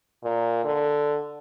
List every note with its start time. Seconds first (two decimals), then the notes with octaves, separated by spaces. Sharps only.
0.24 A#2
0.64 D3